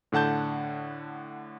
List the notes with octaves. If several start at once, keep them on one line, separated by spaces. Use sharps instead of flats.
A2 D3 F#5 A5 G6